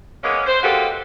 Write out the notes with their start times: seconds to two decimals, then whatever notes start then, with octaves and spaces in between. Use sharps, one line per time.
0.24 G#3 A#3 B3 C#4
0.47 C5
0.63 B2 G#3 A#3 F#4 G4 A4